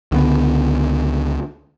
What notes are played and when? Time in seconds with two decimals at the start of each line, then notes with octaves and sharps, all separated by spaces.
0.12 C#2 D3 E3 B3